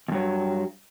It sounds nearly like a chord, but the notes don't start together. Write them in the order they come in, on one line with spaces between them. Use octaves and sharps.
E2 G2 F#3